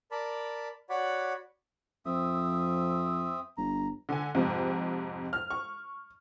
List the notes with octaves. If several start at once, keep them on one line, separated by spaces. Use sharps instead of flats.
A#4 D5 A5 B5
F#4 C#5 D5 F#5 B5
F2 C4 E5 D#6
G1 A#5
D3 G#5
F2 G#2 C3
F6
C#6